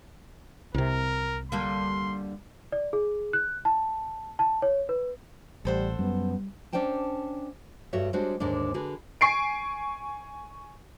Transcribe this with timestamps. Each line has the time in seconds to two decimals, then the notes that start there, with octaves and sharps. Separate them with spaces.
0.74 C2 C3 A#4
1.52 D3 G3 A#3 C6
2.72 D5
2.93 G#4
3.33 F#6
3.65 A5
4.39 A5
4.62 C#5
4.89 B4
5.65 A1 G3 A4 C5 F#5
5.99 F#2 G3 B3
6.73 C#4 D4 C5 D5 G5 A5
7.93 G2 G3 F#4 A4 C#5 E5
8.13 G3 G#3 D4 F#4 C5 C#5
8.40 D#2 G#2 D3 G#3 D4
8.74 D3 F#4 G#4 B4
9.21 G#5 C#6 C7 D7